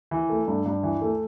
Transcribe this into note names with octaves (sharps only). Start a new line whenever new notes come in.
E3
A3
G2
G2
E3
A3